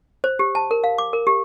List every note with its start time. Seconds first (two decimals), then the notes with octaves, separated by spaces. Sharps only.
0.24 C5
0.39 G4
0.55 A5
0.71 A#4
0.84 F5
0.98 D6
1.13 A#4
1.27 G4